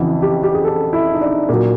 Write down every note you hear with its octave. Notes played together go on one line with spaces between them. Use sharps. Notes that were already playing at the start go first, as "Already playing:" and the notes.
Already playing: F2 C#3 E3 F#4
G4
G4
G#4
A4
E4
D#4
D4
A#2 F#3